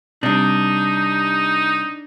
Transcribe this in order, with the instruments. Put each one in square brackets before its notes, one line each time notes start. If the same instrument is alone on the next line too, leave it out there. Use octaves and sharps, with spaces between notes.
[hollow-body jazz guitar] C3 G3 [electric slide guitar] D4 [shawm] D#4